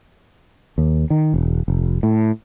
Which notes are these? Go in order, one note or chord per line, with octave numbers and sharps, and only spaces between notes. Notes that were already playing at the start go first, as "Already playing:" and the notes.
D#2
D#3
E1
F1
A2